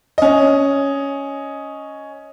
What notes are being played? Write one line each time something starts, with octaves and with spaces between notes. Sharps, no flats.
C#4 D#5